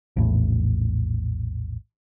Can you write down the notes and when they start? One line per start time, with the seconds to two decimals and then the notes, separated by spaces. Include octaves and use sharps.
0.16 A#1 E2 A2